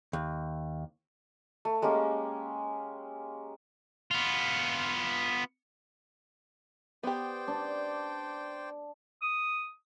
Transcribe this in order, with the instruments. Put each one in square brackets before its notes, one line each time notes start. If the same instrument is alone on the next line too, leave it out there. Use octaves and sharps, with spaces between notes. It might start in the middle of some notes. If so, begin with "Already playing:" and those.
[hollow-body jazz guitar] D#2
[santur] A3
G#3 A#3 C#4 G4
[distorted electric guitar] B3 F4
[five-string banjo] B3 G4 [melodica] C5 D5 G5
[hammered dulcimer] D4
[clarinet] D#6